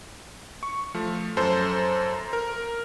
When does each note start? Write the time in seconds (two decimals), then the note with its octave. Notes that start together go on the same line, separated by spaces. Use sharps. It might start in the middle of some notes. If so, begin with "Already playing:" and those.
0.63 C#6
0.95 F3 A3
1.37 F#2 A4 C5
2.14 A#5
2.33 A#4